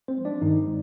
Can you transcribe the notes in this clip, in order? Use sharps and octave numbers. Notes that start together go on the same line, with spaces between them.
C4 C5
F3 G#3
D4 D5
G2 D#3 D#4
G#3